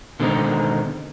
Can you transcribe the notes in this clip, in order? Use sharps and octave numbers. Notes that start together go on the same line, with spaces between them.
B2 D3 D#3 G#3 C4 D#4